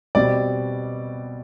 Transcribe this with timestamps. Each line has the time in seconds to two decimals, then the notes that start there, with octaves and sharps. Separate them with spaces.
0.15 B2 G3 C4 D5